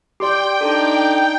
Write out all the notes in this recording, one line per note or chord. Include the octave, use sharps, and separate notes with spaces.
G4 D5 G5 C6 D6
D4 D#4 A4